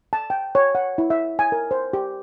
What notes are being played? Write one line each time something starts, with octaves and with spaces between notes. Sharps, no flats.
A5
G5
C#5
F#5
E4
E5
G#5
A#4
C5
G4